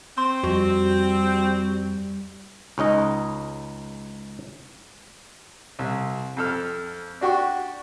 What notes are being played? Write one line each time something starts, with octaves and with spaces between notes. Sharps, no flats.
C4 C6
F2 G3 F#4
C#2 C#4 D#4 D#5
C2
F2 A4 F6
D4 F#4 G4 C#6